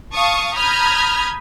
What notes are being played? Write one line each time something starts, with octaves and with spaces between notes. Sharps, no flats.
F5 A5 C#6 D#6
A#5 B5 D#6 F6 G6 G#6